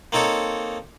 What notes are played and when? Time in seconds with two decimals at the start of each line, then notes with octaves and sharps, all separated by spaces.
0.12 A#3 C4 D#4 A4 C#5